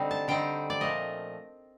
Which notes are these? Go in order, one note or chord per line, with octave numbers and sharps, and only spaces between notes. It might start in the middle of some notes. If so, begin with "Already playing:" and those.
Already playing: D3 G3 C4 D#4
A5
D3 G3 C4 D#4 G5
D5
A#2 F3 A3 D#5